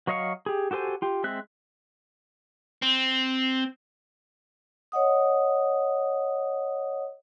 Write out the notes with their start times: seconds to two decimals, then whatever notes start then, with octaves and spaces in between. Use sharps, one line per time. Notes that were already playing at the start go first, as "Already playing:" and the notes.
0.07 F#3 C#5 D#5 F5 C#6
0.46 G4 G#4
0.71 F#4 G4 A4 C5 G#5
1.02 F4 G4
1.24 G#3 C4 E5 F#6
2.82 C4
4.92 C#5 D#5 F#5 D#6